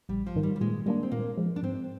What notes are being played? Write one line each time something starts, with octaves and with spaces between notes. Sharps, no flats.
A#1 G3
F3
G#2 D#3
G3
G3
A#2 G#3
G3 G#3 A#3 D4
C4
A#2 A#3
F3 G#3
D4
G#2 C4